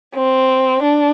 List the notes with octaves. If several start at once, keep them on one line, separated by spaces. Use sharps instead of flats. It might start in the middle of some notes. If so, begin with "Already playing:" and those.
C4
D4